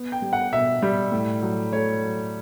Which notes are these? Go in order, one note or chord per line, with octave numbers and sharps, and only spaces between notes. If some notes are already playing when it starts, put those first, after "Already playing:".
Already playing: B3
G5
G3
F#5
B2 E5
G3
A2
F#3
A3 C#5
F#3